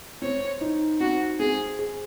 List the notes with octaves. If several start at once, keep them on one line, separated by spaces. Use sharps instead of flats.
C4 C#5
D#4
C4 F#4
C4 G#4
G#4